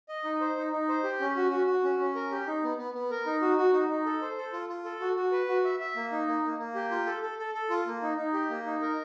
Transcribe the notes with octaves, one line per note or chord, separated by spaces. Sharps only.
D#5
D#4
C5
D#4
D#4
C5
G4
C#4
F#4
F#4
F#4
C#4
C#4
A#4
G4
D#4
B3
B3
B3
A#4
D#4
F#4
F#4
D#4
D#4
A4
C5
A4
F4
F4
A4
F#4
F#4
B4
F#4
E5
E5
A#3
D#4
A#3
A#3
A#3
G4
F4
A4
A4
A4
A4
F4
A#3
D#4
D#4
G4
A#3
D#4
A#4